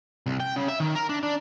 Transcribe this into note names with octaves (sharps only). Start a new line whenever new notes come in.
C2
G5
C#3
E5
D#3
A#4
D4
D4